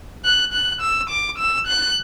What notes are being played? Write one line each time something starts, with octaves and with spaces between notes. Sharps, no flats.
F#6
F#6
E6
D6
E6
F#6